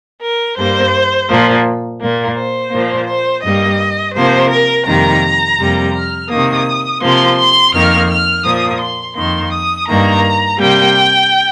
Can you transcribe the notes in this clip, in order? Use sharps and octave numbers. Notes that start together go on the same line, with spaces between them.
A#4
G2 G3 A#3 C5
A#2 F3 A#3
A#2 A#3
C5
A#2 F3 A#3
C5
G2 G3 A#3 D#5
C3 F3 A#3 C5
A#4
F2 C3 D#3 G3 A#3 A#5
F2 C3 G3 A#3
F6
C3 D#3 A#3 D#6
C3 F3 A#3 C6
C6
F2 D#3 A#3 F6
F6
A#2 F3 A#3 D#6
C6
F2 D#3 A#3 C6
D#6
G2 D#3 A#3 A#5
C3 G3 A#3 G5